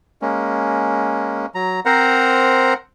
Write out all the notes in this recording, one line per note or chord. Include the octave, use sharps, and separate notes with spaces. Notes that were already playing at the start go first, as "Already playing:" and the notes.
G#3 A#3 C#4
F#3 A#5
C4 A#4 C5 F#5 A#5